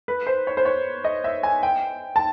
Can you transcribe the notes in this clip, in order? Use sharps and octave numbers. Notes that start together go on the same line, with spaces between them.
B4
C5
C#5
C5
C#5
D#5
E5
G#5
G5
A5